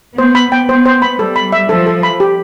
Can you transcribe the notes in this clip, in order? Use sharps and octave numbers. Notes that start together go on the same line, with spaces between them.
B3 C5
B5
G5
B3 C5
C5
B5
G3 A4
B5
E5
F3 A4
A4
B5
G4